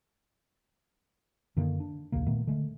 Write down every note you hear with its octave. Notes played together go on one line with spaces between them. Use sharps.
F#2 D3 D#3 A#3
D4
A#1 D#2 C#3 A#3
A#2 D#3 A3 B3
D3 G#3 A3